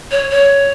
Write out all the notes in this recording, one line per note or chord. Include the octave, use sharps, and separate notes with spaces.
C#5
C#5